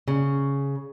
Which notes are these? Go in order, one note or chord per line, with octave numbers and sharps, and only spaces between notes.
C#3